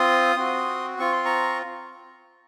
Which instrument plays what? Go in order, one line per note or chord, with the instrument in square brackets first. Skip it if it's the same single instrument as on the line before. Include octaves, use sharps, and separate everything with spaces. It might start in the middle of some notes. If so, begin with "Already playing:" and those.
Already playing: [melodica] C4 F4 C6 D#6
C4 F#4
C4 F4 C#6
C6
A#5 C#6